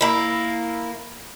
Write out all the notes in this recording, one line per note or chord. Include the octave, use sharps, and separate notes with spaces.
A#3 E4